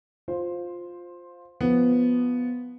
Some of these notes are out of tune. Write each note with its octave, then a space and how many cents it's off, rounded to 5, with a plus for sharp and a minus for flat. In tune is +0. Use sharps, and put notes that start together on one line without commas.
F4 +10 C5 +0
F3 +0 B3 +0